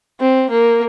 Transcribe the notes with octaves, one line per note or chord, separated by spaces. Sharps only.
C4
A#3